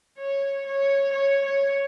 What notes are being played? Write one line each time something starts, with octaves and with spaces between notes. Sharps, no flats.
C#5
C#5
C#5
C#5